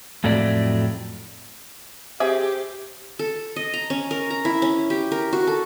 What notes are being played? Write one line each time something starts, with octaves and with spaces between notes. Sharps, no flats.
F2 A2 F#3 A3 C4 D5
C4 G4 G#4 E5
A4
D#5
A#5
C#4
A#4
A#5
E4
C#4
G4
A#4
F#4
A4